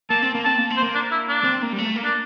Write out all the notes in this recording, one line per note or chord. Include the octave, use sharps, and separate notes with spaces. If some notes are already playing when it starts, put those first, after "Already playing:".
A#3 A5
C4
A#3
C4 A5
A#3
C4
C5
A#3
D4
E4
D4
C4
A#3
G3
A3
A#3
D4